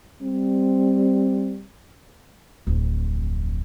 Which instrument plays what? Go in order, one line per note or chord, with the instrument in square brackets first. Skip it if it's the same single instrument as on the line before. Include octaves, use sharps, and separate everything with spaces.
[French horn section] G3 C4
[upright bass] D1 F2